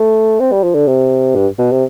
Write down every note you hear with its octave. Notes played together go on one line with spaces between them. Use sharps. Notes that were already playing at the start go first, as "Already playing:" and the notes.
Already playing: A3
C4
G3
F3
D3
C3
G2
B2
C3